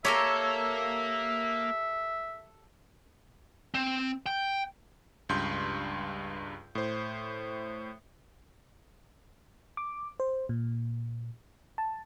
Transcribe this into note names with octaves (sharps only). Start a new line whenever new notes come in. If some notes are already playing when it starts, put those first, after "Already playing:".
A#3 G4 A4 A#4 C#5 E5
C4
G5
C#2 G2 C6 G6
A2 C5
D6
C5
A#2
A5